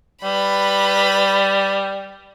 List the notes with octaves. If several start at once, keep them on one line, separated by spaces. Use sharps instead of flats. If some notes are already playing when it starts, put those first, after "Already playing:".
G3 B4 B5